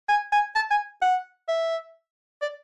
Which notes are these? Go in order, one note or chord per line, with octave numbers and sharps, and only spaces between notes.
G#5
G#5
A5
G#5
F#5
E5
D5